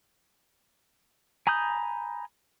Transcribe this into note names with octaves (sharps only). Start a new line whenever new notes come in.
G#5 A#5 B5 D#6 G6